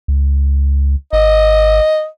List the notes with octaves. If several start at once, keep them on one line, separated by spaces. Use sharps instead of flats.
C#2
G#1 D#5